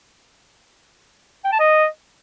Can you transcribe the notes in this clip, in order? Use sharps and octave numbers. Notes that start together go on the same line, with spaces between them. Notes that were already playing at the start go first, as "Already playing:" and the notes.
G5
A5
D#5